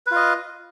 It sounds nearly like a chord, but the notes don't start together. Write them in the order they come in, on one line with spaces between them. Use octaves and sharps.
B4 F4 D#5